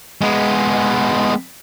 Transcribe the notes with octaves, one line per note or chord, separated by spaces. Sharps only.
G#3 B3